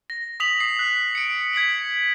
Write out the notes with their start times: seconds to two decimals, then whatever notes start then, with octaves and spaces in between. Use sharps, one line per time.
0.10 A#6
0.40 D#6 B6 F7 F#7
0.60 D#6 C7
0.79 F#6
1.15 C#7 D7
1.53 G#6 B6 C#7 F#7